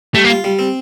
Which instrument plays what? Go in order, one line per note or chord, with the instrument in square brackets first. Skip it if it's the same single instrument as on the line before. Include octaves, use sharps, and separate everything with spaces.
[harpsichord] G3 [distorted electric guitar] A3
[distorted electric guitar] A#3
[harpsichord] F4
G3
C4